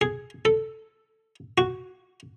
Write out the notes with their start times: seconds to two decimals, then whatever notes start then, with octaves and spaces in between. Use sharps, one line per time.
0.01 G#4
0.45 A4
1.58 F#4